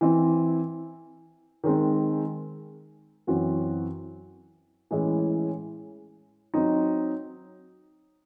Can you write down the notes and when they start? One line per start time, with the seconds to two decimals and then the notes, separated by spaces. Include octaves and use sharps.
0.01 E3 C4 E4
1.64 D#3 G#3 C4
3.27 F#2 E3 C4 F#4
4.91 A2 E3 G#3 C#4 E4
6.54 F#3 C4 D#4